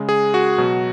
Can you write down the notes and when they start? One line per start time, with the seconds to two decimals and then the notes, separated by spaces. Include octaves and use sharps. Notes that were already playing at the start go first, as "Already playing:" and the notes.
Already playing: C#3 G#3
0.09 G#4
0.34 F#4
0.58 B2 F#3